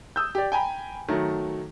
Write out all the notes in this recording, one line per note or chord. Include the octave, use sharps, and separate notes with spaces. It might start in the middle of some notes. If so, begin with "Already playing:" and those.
D#6 E6 G6
G4 D5
G5 G#5 A#5 B5
D#3 F#3 A3